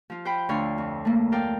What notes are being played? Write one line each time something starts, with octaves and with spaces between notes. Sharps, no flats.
F3 F4
C5 G5 B5
D2 D3 C#5 F5 C6
F2
A3 A#3
A#4 D5 F5 G5